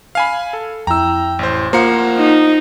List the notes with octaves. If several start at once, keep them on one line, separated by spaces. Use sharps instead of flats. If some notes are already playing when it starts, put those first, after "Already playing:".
F5 G#5 B5
A4
F2 E4 G5 A#5 E6
A1 C5
F3 A#3 F4 C5 F#5 A#5 C#7
D#4